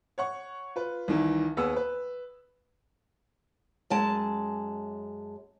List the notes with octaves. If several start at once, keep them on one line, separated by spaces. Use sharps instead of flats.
C#5 F#5 C#6
F4 B4
C2 D#3 E3
D#2 B3 G#4 E6
B4
F#2 G#3 A5